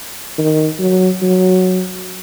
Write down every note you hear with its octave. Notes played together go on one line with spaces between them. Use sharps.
D#3
F#3
F#3